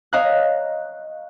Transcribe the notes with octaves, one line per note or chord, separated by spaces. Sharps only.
C#5 D#5 F5 A#5 F#6